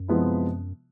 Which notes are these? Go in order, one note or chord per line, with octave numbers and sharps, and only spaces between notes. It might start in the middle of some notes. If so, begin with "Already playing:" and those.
Already playing: F#2
C3 F3 G#3 B3 E4